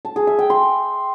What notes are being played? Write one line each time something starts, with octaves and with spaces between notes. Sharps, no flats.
A5
G#4
E5
G5
C6